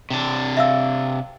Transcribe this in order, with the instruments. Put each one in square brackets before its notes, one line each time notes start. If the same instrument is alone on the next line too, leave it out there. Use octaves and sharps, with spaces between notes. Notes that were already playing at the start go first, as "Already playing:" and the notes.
[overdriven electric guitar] C3 D4
[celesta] E5 F5 E6